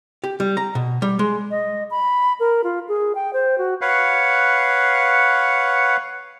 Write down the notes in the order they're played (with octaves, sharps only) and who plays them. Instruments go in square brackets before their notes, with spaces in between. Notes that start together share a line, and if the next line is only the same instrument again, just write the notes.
[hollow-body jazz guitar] G4
G3
A#5
B2
G3
G#3
[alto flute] D#5
B5
A#4
F4
G#4
G5
C5
F#4
[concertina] B4 C#5 F5 F#5